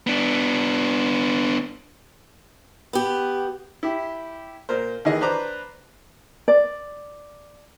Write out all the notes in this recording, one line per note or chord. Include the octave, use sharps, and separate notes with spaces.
B3 D4
B3 G4
E4 G4
A#2 A#4 C5
D#2 D#3 E3 G#4 D#5
D4 B4 C5 A#5 D6
D5